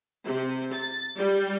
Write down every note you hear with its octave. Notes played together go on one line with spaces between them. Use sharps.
C3
A6
G3